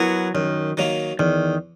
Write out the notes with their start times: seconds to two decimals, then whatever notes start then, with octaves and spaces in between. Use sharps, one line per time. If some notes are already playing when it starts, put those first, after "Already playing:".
Already playing: F#3 B3 E4 A#4
0.34 F#2 D#3
0.77 D#3 F#3 A#3
1.19 E2 D#3